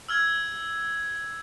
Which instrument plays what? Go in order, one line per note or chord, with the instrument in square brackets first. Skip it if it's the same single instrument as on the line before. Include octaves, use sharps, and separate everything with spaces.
[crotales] E6 F6 G#6